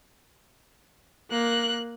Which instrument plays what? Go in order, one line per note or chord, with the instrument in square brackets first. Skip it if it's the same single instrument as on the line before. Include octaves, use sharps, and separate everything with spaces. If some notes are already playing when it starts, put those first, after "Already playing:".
[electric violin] A#3 F#6